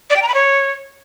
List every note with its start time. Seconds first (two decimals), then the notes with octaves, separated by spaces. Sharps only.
0.10 D5
0.16 G5
0.22 A#5
0.28 B5
0.34 C#5